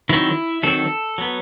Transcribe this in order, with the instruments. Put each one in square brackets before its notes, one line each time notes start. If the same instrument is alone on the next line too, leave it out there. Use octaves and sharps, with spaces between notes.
[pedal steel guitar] D#3 F#3 C4 E4
D#3 F#3 C4 A4
F#3 B3